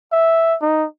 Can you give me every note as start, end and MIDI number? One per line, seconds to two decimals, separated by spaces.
0.12 0.55 76
0.61 0.86 63